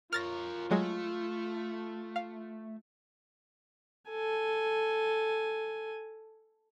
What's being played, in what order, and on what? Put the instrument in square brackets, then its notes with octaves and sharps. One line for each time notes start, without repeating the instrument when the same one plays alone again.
[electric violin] F4 [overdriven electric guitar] A#4 C#5 [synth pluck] F6 A6 A#6
[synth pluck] F#3 G#3 [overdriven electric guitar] A3
[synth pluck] F5
[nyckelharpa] A4 G#5